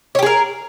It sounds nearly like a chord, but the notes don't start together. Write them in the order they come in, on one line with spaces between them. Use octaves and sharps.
C#5 G4 G#4 A#4